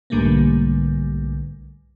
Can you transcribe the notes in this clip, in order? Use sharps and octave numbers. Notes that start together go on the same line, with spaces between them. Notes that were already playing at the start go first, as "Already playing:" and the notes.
B1 G#2 D3 G3 A3 A#3